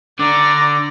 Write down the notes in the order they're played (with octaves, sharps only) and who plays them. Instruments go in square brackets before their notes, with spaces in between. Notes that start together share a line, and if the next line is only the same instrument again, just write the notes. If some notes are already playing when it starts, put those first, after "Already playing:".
[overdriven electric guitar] D3 [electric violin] D5 A#5 [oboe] D6